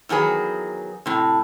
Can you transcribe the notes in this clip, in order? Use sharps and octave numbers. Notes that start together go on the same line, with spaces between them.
E2 D#3 F#3 G#4 B4
A2 C3